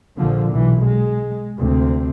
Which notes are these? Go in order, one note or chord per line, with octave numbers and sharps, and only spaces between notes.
A#1 A#2 D3 F3
B1 E3
G#3
D2 C3 C4